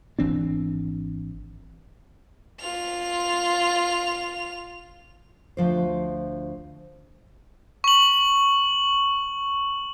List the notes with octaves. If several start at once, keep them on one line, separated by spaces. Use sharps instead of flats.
G#1 E3 C4 D4
F4 F7
D2 F3 C5
C#6 F#7